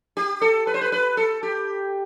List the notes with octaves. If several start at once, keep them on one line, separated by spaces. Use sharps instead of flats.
G4
A4
B4
C5
B4
B4
A4
G4